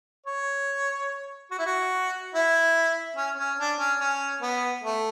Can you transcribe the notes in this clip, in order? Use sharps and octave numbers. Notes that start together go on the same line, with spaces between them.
C#5
F#4
E4
F#4
E4
C#4
C#4
D4
C#4
C#4
B3
A3